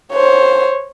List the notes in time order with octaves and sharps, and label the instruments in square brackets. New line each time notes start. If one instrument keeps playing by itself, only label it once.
[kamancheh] C5 C#5